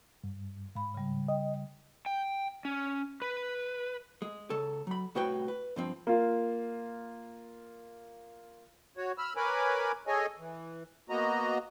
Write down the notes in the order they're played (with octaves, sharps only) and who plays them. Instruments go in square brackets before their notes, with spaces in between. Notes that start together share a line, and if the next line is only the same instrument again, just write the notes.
[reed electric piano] G2
[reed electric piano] G#2 [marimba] F5 B5
[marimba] C#3 G3
[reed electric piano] D#5 [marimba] G5
[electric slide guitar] G5
C#4
B4
[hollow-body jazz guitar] G#3
C#2 C#3 A4 C#5
F#3 B5
C2 A2 F#4 B4 C#5 G5
B4
G2 F3 C4
[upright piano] A#3 F4
[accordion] F#4 C#5
B5 E6 F6
A#4 B4 C#5 G#5 B5 D6
G#4 A4 C#5 D#5 G#5
E3
A#3 B3 F#4 D#5 A#5